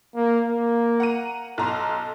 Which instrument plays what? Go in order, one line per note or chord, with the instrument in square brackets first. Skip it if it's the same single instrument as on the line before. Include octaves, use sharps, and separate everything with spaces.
[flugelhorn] A#3
A#3
[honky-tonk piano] F#5 A#5 D#7
[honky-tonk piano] B1 A#5 C6 [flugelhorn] A4